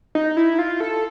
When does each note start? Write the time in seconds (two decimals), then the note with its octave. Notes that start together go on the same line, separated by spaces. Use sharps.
0.15 D#4
0.37 E4
0.59 F4
0.80 A4